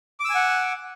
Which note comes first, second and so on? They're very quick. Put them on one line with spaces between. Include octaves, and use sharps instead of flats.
D6 E6 G#5 F#5